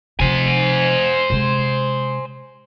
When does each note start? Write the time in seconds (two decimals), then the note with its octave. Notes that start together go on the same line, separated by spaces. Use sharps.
0.19 C3 F3 C5 G#5
1.30 C3 G#3